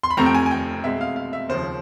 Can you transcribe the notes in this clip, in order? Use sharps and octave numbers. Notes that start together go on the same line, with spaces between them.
C6
B5
F2 C3 F3 A3 C4 A#5
G5
G#5
G#5
G5
B2 G#3 C4 E5
F5
F5
E5
D#2 C#3 F3 C5